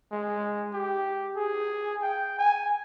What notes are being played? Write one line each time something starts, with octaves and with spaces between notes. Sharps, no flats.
G#3
G4
G#4
G5
G#5